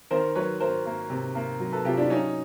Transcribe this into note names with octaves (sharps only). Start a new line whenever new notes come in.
D#3 A#4 C5
F#3 B4 C#5
F#3 A#4 C5
A#3
C3
A#3
F#3
A4 B4
C3 F4 G4
D4 E4
F#3 C#4 D#4